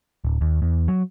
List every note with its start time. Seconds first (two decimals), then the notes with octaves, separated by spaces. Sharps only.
0.25 D1
0.41 D#2
0.62 E2
0.88 F#3